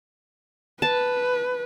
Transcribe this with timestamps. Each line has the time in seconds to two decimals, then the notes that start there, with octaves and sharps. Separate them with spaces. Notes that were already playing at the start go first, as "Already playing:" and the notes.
0.82 B4 A5